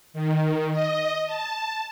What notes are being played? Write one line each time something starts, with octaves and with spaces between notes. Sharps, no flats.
D#3
D#5
A5